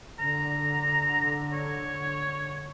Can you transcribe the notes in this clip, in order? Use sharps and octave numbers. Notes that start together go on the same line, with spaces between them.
D3 A#5
C#5